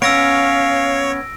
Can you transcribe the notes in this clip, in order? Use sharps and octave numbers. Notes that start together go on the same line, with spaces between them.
B3 C#4 C#5 F5 E6 A#6 D7